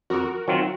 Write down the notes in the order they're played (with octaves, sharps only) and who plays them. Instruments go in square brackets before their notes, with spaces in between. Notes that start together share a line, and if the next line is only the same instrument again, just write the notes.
[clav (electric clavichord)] F2 [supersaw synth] F#4 A#4
[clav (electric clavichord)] D#3 F#3 C4 F4